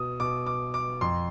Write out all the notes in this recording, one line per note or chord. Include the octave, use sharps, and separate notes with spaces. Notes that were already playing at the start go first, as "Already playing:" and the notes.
Already playing: B2 D#6
B2 D6
D6
D6
F2 C6